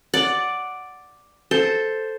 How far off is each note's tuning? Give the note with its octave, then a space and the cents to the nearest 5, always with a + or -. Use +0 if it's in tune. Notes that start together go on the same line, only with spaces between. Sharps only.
D5 +0 F#5 +0
A4 +0 C5 +0